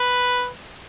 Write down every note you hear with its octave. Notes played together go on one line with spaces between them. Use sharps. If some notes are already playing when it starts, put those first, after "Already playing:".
Already playing: B4